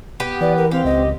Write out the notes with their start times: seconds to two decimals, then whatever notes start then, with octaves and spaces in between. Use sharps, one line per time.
0.20 B3 G4
0.41 E3 B4 D5
0.57 A#4
0.71 C4 G4 F5
0.85 C#2 D#5